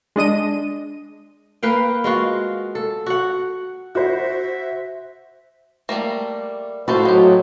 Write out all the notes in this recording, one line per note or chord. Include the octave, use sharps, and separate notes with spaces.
G#3 D4 D#5 D#7
A#3 B4 F5 G5
G#3 F4 F#4 F5
A4
F#4 F#5
F#4 C5 E5
G3 A3 A#3
A2 F4 F#4 A4 B4 C5
A2 F#3 D#4 G4